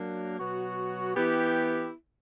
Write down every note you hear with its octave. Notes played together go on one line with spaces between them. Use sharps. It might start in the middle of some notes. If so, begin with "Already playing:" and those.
Already playing: F#3 A#3 D4
B2 F#3 B3 F#4
E3 B3 E4 G4